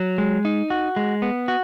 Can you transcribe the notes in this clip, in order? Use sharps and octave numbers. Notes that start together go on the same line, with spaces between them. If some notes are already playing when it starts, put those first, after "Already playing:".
Already playing: F#3
G#3
D#4
F#4
G#3
B3
F#4